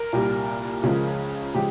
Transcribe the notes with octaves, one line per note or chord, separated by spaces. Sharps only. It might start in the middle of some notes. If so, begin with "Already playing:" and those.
Already playing: A#4
C2 A#2 G3
C#2 C#3 F3 G#3
C#3 F3 G#3 G4